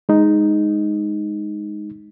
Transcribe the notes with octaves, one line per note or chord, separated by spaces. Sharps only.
G#3 D#4